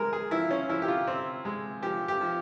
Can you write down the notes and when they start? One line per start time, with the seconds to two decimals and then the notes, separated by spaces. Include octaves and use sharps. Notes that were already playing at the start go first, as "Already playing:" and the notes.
Already playing: G#3 C4 A#4
0.13 G#4
0.31 F3 E4
0.51 C#4
0.69 F3 E4
0.82 G4
0.88 F4
1.07 C4
1.45 G#3
1.82 F3 G4
2.08 G4
2.21 F3